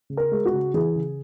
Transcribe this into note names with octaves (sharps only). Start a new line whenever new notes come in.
C#3
A#4
G#3
F#4
C#3
E3 G#4
C#3